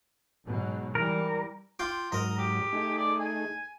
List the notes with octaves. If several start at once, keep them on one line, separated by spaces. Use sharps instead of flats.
G#2 B2 F#3
E3 G3 A#4
F4 G5 D6
G#2 F#3 A#4 D#5 A#5
G4
A3 D#4 G#4
D5
G#5